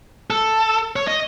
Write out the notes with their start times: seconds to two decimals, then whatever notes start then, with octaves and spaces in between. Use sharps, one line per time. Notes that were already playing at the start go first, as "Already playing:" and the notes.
0.30 A4
0.96 C#5
1.08 D#5